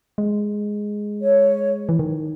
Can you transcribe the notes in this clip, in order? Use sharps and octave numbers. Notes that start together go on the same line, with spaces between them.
G#3
C#5
E3
D#3